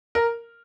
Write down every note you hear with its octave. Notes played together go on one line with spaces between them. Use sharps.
A#4